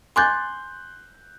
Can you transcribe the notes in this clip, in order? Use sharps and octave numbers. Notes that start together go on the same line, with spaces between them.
G#5 C6 D6 F#6 G6 A6